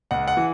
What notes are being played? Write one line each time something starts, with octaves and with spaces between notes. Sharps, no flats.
C#2 F#5
F#5
E3